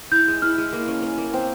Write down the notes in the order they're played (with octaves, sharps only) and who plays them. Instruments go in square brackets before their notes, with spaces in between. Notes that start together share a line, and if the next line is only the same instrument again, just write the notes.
[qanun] E4 [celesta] G6
[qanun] G#3
[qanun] E4 [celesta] F6
[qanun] G#3
A#3
C#4
C#4
A#3
C4